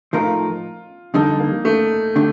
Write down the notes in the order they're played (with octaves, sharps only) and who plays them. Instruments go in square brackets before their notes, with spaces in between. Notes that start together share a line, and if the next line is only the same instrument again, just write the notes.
[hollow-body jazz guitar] A2 F3 A3 D#4 A#4 [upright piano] F4
[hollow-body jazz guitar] F2 D3 G3 D4 A4 [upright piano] D#4
[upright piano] A#3
A3
[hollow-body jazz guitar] D3 A3 D4 G4